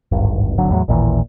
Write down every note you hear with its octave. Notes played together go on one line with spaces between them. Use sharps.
D1 G#1 G2
D1 G#1 D3 F#3
E2 A2 F#3
A1 D#2 A#2 E3